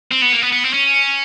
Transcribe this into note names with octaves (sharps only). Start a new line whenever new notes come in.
C4
B3
A#3
B3
B3
C4
C#4